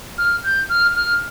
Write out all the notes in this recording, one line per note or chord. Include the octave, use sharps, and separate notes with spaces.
F6
G6
F6
F6